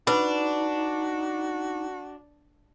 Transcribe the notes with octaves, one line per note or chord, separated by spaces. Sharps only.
D4 D#4 F#4 B4 B5